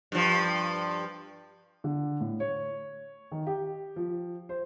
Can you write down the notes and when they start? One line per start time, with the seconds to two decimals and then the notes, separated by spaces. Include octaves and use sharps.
0.12 G2 F3
1.84 D3
2.21 A2
2.40 C#5
3.32 D#3
3.47 G4
3.96 F3
4.49 C5